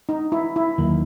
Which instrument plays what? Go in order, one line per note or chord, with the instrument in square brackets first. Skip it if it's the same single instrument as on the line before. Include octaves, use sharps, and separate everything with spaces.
[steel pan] D#4
E4
E4
[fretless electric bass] D#2 D#3 F#3 A#3